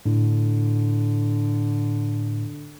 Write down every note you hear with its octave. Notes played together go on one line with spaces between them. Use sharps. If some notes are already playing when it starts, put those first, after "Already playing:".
A2 D3